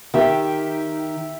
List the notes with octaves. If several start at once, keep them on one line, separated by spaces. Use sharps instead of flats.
D#3 G4 E5 G5